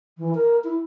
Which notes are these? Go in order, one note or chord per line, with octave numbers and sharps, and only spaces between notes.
E3
A#4
E4